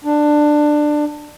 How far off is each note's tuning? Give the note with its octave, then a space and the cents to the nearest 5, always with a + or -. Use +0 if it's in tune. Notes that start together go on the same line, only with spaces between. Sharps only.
D4 +15